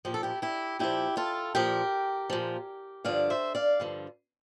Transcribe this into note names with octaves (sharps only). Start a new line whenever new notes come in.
A#2 F3 G4
A4
E4 G4
E4 G4
A#2 F3 E4 G4
F4 A4
A#2 F3 G4 A#4
A#2 F3
G2 D3 F3 D5 F5
C5 E5
D5 F5
G2 D3 F3